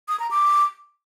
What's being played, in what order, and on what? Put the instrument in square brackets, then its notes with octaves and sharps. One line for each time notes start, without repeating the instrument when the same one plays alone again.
[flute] D#6
A#5
D6